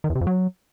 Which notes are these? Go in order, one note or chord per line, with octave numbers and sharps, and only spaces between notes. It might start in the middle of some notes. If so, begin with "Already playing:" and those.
D#3
E2
C3
F2
F#3